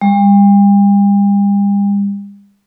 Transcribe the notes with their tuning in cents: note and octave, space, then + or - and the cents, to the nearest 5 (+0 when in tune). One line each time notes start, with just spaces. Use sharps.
G3 +40